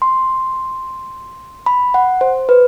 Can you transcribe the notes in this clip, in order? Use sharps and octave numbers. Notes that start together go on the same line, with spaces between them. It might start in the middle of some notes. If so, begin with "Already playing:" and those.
C6
B5
F#5
C5
B4